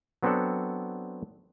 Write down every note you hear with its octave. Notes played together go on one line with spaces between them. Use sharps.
F#3 B3 C4 D4 A4 F#5